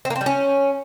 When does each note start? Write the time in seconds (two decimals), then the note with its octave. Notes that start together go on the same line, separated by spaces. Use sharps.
0.05 C4
0.10 A#3
0.16 C4
0.21 G3
0.26 C#4